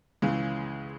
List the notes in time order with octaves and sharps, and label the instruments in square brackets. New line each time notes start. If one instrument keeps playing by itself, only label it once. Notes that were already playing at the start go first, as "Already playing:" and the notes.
[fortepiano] C#2 C#3 E3 G#3